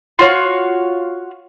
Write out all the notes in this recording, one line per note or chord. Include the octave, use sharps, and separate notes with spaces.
F4 F#4 C#5 F5